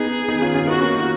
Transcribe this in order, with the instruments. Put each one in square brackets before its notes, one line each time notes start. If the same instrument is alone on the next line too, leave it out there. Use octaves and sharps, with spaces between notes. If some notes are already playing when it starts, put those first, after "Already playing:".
Already playing: [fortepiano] B3 D#4 [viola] G#4
[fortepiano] B3 D#4
C#4 F4
C#4 F4
[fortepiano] B3 D#4 [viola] F#4
[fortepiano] A#3 C#4
D#4
F4